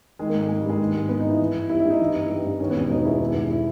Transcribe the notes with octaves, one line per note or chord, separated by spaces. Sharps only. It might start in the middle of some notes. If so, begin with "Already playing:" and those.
D#3 G#3
A#3
G#1 G#3
G#3 A#3
G3
G2 G#3
D#3
G#1
A#3 B3
D#4
G2
E4
E3
G1
G3 E4
E4
G2 D#4
E3
G1
G3
G2
D#3 C#4
B3
E1
C#4
E1 D#4
E2 E4
D#3
E1
E4